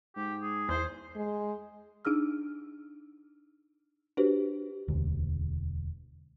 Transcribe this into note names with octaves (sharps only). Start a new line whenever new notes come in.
G#2 G4
G#4
E2 C5
G#3
D4 D#4 G#4 E6 F6
D4 F#4 G4 B4 C5
E1 D2